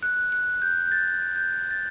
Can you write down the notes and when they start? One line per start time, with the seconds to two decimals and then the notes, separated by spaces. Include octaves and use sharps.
0.03 F#6
0.32 F#6
0.62 G6
0.87 G6
0.92 A6
1.36 G6
1.71 A6